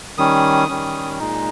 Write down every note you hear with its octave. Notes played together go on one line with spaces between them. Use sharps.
D#3 G3 C#4 D#6
D#3 G3 C#4
A#2 G#3 D#4